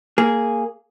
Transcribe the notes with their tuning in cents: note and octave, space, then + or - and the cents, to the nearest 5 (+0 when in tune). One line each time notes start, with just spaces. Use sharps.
A#3 -10 G#4 +0